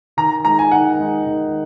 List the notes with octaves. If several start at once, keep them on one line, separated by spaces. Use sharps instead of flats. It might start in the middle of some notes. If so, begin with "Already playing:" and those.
D#3 A#5
G#3 D#4 A#5
G#5
D#3 F#5
G#3 D#4
D#3